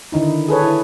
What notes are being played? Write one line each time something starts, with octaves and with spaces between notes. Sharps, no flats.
D3 D#3 D#4 E4
G#4 A4 B4 C#5
E4